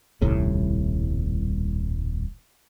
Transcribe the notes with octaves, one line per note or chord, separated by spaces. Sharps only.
D#1 C2 A2